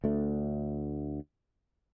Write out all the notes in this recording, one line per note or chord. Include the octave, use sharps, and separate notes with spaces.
D2 A3 D4